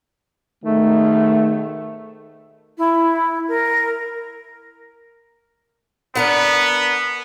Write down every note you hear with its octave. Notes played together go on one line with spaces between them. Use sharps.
G#2 B2 D#3 A3
E4
A#4
B3 D4 A#4 F#5